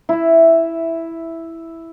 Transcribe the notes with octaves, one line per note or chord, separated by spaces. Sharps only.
E4 E5